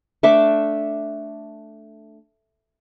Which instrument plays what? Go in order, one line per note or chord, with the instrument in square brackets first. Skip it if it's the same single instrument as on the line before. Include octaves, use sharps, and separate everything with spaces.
[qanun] A3 D4 E5 D6